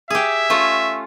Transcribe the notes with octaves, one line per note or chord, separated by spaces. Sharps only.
G4 G#4 E5
A3 C#4 F4